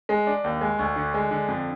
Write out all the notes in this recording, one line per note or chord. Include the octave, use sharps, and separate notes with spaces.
G#3
D4
D#2
G#3
D2
D3
G#3
D3
F2